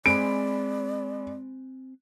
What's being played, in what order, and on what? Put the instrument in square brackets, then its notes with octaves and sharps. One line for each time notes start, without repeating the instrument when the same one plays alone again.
[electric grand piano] G#3 B5 [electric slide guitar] C4 C5 G#5 [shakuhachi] D5 [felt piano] D7